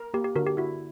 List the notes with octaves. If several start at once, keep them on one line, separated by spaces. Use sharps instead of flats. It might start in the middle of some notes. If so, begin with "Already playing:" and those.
Already playing: A#4
A#3 G4
G4
D3 F#4 A#4
G4
E4 F#4